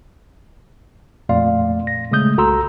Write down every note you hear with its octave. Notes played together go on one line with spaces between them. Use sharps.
F2 A#2 A3 D5 F5 C6
A#6
C#3 G#3 A3 D#6 G6
C2 F#4 A4 A#5 C6 E6